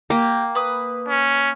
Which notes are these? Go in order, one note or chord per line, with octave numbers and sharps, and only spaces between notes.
A#3 G4
B4 D#6
C#4